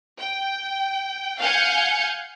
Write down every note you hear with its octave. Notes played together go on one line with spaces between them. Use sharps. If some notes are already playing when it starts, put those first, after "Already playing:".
G5
F5 F#5 G#5 G6 C#7